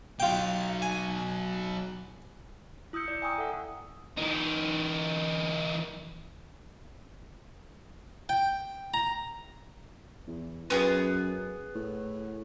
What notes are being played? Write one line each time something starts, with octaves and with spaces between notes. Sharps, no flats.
B2 F#3 F4 G5
G#5
E4 D#6 E6 G6 C#7
D5
G5 G#5 A#5 C#6 D#6 E6
A4 E5 F#5
E3 D#4
G5
A#5
E2
F#2 B3 G4 G#4
A2